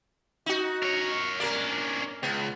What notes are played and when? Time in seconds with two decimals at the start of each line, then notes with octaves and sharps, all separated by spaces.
0.46 D#4 F#4
0.82 A#4 C#5
1.40 A#3 C#4 D4 A#4
2.23 C#2 B3